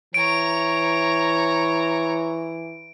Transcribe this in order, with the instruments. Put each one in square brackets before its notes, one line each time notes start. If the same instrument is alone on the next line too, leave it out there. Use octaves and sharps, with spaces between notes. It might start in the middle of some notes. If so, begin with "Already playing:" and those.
[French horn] E3 [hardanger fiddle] C#5 A#5 [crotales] D7